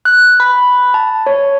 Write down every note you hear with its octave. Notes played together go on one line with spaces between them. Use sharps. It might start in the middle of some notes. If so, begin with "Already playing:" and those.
F#6
B5
A5
C#5